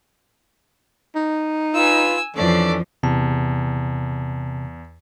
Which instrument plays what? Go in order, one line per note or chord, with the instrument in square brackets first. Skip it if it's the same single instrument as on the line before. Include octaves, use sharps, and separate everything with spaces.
[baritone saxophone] D#4
[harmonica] F4 B4 [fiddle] G#5 E6
[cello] F2 F3 [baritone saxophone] E3 [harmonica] C#4 D4 A4 [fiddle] D5
[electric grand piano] E2 [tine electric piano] C3 A5